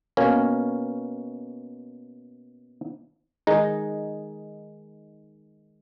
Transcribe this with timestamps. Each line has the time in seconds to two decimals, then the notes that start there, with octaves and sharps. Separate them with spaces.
0.17 B2 A#3 C#4
3.47 D#3 G#3 D#4